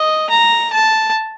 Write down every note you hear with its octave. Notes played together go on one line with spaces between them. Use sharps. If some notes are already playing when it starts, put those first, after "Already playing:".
Already playing: D#5
A#5
A5